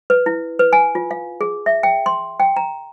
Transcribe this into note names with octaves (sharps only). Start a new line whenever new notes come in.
B4
E4
B4
G#5
F4
F5
G#4
E5
G5
C6
G5
A#5